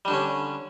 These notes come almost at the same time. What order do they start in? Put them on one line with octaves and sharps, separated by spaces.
G3 D4 D3 C#4